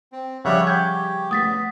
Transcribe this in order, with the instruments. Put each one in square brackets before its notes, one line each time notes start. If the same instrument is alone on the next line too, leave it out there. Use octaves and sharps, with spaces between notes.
[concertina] C4
[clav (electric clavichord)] C#3 G3 [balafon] F3 [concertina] C#5 E5 F#5
[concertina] G4 [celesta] C#6 G6 G#6
[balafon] A3 [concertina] B3 [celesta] D#6 A6 B6